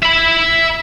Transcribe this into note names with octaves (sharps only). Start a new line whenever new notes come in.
E5 B5